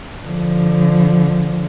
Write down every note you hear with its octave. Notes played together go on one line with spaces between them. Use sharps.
D3 F3